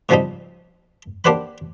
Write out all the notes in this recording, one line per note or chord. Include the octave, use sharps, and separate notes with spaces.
G#2 C#3 F3 G3 C4 D#4
A#3 D4 G4 C5 F#5 B5